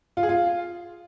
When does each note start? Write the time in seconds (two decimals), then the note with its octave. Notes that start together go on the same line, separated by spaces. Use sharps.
0.17 F4
0.23 G#4
0.29 F4